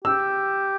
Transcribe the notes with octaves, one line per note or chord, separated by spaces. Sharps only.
G4 E6